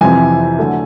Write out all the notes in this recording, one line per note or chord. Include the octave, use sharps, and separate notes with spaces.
F2 C3 E3 G#5
D3 F#3 A3